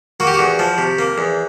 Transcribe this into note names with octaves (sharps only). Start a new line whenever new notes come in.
A#3 F#4
G4
F#4
E2
F3
C3
A#3
E2